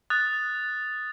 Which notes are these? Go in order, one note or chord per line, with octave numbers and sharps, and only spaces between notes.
D#6 F#6 A6